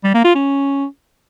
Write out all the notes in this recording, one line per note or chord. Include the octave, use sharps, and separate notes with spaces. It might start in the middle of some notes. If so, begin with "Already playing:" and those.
G3
A#3
F4
C#4